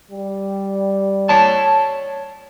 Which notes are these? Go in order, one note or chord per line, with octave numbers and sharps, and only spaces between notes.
G3
C#5 A5